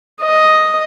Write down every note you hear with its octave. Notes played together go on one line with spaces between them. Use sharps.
D#5